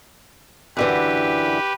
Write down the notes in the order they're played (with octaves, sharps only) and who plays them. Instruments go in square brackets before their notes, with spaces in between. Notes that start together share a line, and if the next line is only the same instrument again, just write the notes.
[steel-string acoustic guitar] F#2 D3 E3 [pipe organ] G4 B4